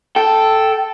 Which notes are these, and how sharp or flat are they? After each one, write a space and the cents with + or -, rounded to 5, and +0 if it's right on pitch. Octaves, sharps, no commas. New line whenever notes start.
A4 +0 G5 -5